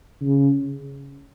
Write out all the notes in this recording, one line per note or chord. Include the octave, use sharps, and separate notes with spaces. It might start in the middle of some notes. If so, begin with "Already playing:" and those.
C#3